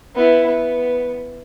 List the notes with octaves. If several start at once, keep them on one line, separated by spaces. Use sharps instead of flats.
B3 E4
B3